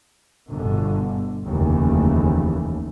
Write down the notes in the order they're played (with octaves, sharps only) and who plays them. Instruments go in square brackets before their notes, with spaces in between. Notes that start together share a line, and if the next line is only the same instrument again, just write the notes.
[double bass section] G1 B2 D3
F1 D#2 C#3 E3 A3